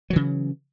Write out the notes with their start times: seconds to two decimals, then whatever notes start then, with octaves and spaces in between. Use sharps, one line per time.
0.10 F#3
0.13 E3
0.16 C#3